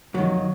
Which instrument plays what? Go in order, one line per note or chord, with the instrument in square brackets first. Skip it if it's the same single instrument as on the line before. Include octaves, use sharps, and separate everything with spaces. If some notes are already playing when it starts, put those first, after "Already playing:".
[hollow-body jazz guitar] F2 D#3 F#3